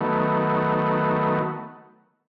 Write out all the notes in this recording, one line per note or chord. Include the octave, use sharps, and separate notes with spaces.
D#3 F#3 A3 B3